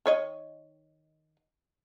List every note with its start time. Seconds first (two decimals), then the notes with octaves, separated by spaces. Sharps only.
0.06 D#3 C#5 D#5